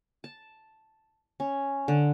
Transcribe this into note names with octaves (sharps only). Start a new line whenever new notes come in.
A5
C#4
D3